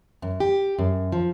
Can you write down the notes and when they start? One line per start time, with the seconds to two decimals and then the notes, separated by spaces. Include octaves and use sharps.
0.22 F#2
0.40 G4
0.79 F#2
1.12 F3